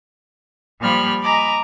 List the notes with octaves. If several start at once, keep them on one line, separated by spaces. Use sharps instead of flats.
A#2 F3 G3 B5 F6 G#6
D#5 G#5 A#5 B5 D6